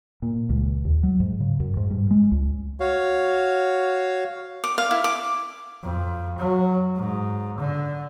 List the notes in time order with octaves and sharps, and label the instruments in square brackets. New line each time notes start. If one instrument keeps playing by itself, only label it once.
[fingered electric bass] A#2
C#2
D#2
F#3
G#2
C#3
F#2
G#2
G2
G#3
C#2
[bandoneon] F#4 C#5 F5
[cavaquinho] D6
F5
E4
D6
[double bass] F2
F#3
G#2
D3